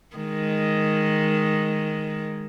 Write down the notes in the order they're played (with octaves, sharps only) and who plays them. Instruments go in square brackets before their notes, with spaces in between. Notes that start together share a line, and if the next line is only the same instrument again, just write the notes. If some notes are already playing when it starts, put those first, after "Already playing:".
[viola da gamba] D#3 G#3